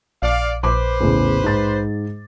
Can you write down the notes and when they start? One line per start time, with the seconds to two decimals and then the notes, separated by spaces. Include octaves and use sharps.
0.23 A#1 D5 F5
0.64 A#1 B4 C5 D6
1.00 E2 A2 C#3
1.44 G#2 A6